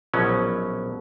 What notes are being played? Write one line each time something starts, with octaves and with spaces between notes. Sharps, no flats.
A#1 B2 F#3 C#4